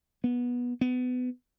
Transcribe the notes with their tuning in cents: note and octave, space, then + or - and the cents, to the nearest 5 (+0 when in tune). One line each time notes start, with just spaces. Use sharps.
B3 -15
B3 +25